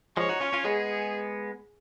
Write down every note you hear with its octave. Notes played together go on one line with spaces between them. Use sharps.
F3 G#3 C#5
D#4 F#4
C#4 F4
C#4 F4
G#3 B3 G#4